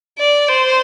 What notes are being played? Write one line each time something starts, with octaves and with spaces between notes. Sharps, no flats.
D5
C5